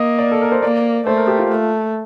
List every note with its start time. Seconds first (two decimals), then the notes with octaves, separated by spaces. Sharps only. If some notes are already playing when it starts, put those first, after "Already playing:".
Already playing: A#3 D#5
0.19 D5
0.31 A4
0.42 A#4
0.52 C5
0.63 A#3 D5
1.06 A3 C5
1.17 A#4
1.27 G4
1.39 F4
1.50 A3